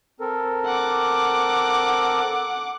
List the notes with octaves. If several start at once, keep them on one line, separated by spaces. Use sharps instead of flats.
C4 A4 A#4
F#5 D6